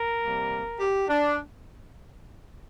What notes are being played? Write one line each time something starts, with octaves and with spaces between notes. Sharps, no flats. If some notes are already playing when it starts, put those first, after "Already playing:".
Already playing: A#4
C3 G3 A#3
G4
D4